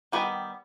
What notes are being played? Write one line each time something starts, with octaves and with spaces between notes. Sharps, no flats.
D#3 G3 B3 F#4 G#4